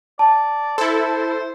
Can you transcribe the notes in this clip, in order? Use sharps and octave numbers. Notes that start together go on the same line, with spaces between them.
D5 A5
E4 A4 C5